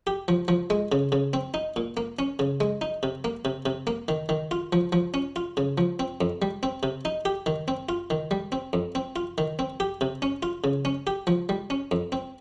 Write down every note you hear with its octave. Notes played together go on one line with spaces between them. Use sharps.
G4
F3
F3
G#3
C#3
C#3
C4
D#4
A#2
A#3
C#4
C#3
G#3
D#4
C3
A#3
C3
C3
A#3
D#3
D#3
F4
F3
F3
C#4
F4
C#3
F3
C4
F2
G3
C4
C3
D#4
G4
D#3
C4
F4
D#3
G3
C4
F2
C4
F4
D#3
C4
G4
C3
C#4
F4
C#3
C#4
G4
F3
G3
C#4
F2
C4